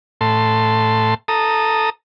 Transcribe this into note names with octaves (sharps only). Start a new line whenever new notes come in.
A2 A5 C6
A4 A#5 D#6